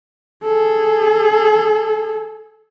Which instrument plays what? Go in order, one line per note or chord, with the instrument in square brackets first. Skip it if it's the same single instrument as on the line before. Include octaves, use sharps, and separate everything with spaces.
[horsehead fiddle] G#4 A4